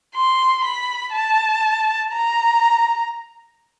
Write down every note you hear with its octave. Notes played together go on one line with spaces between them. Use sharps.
C6
B5
A5
A#5